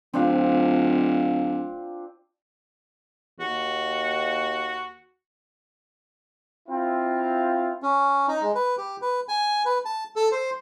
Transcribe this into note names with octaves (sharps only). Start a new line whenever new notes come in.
D1 C4 D4 F4
D#2 F#4
C4 E4 F4
C#4
D#4
G#3
B4
G4
B4
G#5
B4
A5
A4
C5